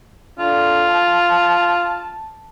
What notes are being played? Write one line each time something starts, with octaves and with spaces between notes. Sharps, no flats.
D3 F4
A5